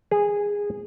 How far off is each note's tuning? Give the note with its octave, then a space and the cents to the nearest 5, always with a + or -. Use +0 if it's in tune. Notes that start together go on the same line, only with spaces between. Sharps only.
G#4 -15